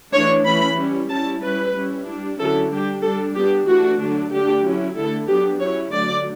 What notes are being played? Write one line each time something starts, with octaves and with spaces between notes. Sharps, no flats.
E3 A3 D4 C#5
E3 A3 C#4 E4 B5
G3 C#4 E4
G3 C#4 E4 A5
G3 C#4 E4 B4
G3 C#4 E4
G3 D4
D3 F#3 C#4 E4 A4
G3 D4 G4
G3 D4 A4
G3 B3 D4 G4
E3 A3 D4 F#4
D3 F#3 A3 D4
D3 A3 D4 G4
F#3 C#4 E4
D3 A3 E4 A4
F#3 B3 D4 G4
F#3 C#4 E4 C#5
D3 F#3 A3 D5